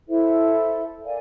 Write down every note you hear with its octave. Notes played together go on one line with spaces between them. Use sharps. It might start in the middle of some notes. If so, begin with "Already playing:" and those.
E4 A4 C5 E5
A#4 D5 F5 G#5